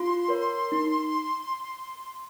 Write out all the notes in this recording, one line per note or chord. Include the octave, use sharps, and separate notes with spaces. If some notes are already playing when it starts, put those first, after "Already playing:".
Already playing: F4 C6
A#4 C#5
D#4